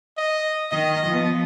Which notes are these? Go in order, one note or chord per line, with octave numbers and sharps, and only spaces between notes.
D#5
D#3 D#5
F3 B3